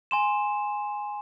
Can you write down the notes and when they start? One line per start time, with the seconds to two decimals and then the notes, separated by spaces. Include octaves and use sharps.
0.11 G#5 C6 E7